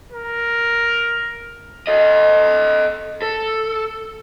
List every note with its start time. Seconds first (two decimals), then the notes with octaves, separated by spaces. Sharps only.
0.12 A#4
1.87 A4 D#5
3.22 A4